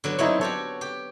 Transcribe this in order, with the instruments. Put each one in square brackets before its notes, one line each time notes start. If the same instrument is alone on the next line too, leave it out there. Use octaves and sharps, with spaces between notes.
[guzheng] D3 F#3 B3
[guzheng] F#3 B3 C4 [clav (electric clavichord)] D#4 E4 C#5
[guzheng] F#4 G4 C#5 [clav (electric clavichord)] A4
[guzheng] G4